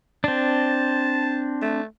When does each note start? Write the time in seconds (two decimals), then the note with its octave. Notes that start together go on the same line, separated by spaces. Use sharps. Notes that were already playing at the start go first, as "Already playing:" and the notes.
0.24 C4 D4 A5
1.62 A3